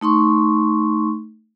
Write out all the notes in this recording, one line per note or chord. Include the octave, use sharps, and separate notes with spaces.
A3 D#4 C6 C#6